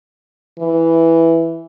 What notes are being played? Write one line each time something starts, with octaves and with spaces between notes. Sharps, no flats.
E3